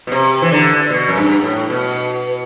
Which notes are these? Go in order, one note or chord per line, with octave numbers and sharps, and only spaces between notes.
B2
C3
E3
D3
B2
F#2
G2
A2
B2